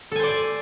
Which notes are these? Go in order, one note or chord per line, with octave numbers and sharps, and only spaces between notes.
A4 C5 D5 G#5